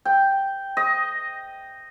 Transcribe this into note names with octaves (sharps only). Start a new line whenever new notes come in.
G5
D#5